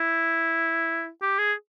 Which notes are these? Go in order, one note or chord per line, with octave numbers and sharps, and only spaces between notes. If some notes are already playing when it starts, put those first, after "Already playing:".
Already playing: E4
G4
G#4